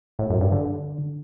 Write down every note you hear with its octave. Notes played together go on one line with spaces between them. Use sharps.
A2
F#2
G2
D3